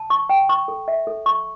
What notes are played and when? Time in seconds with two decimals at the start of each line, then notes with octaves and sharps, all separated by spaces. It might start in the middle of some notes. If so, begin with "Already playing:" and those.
Already playing: A5
0.10 C#6
0.29 G5
0.49 C#6
0.68 A4
0.88 E5
1.07 A4
1.26 C#6